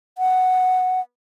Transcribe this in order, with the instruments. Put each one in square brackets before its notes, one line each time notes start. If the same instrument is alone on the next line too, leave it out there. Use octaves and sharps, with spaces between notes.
[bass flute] F#5